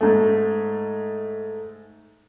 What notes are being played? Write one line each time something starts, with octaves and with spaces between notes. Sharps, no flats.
G#2 A3